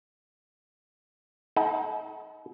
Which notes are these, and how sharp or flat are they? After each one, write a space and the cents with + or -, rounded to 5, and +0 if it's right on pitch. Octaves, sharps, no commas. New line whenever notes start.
D#4 +30 A4 -45 F#5 +0